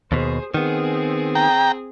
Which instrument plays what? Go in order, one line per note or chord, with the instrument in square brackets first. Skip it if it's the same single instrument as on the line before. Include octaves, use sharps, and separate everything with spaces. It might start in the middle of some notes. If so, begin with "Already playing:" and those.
[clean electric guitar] D#2 B2 [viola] G#4 C5
[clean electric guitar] D#3 B3 [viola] C4 G#4
[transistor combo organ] G5 A#5